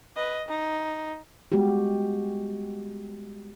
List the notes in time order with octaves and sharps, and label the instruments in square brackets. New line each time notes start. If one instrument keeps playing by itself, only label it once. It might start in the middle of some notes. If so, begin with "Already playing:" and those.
[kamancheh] B4 D#5
D#4
[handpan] G3 G#3 B3 F#4 G4